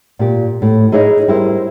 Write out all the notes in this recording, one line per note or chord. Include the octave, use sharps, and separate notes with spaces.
A#2 G4
A2
D#4 E4 G#4 C#5 D#5
G3 E4 A#4 C5